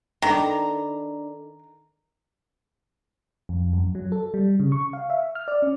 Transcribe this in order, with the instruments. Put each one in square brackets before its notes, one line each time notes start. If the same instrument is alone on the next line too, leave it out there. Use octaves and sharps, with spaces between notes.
[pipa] D#3 [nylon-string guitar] D4 A4 B4 [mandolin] A#5
[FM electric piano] F2
F#2
F#3
A4
G3
C#3
C#6
F5
E5
F6
D5
C#4